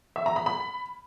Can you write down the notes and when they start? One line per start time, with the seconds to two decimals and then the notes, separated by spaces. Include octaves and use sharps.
0.16 E5
0.26 A#5
0.36 B5
0.46 B5